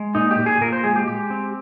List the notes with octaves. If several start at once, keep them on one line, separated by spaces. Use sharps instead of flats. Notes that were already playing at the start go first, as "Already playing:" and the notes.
Already playing: G#3
A#2 D#4
G4
A#2
G#4
A#2 A#4
C5
G#3 G#4
G4
G#3 G4
C4